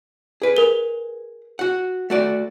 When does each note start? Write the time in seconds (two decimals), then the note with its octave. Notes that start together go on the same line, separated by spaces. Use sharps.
0.42 G#4 B4
0.57 A#4 G7
1.59 F#4 F#5
2.10 A3 F#4 D5